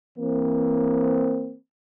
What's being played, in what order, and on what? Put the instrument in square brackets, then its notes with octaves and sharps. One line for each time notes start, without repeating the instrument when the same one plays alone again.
[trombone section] E3 A#3 C4